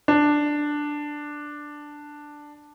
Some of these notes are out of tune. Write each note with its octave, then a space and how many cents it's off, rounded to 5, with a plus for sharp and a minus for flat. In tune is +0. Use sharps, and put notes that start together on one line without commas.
D4 +5